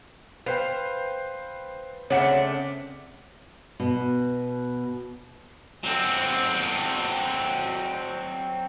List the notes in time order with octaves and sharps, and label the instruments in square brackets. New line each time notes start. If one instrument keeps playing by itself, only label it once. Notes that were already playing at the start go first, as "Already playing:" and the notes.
[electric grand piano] B4 C5 G5 [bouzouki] F5
[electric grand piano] C#3 C4 C#7 [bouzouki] A3 D4 [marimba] C#5 F#5
[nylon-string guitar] B2
[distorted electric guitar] F#3 C4